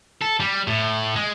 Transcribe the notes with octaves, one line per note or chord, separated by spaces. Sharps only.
A4
G3
A2
G#3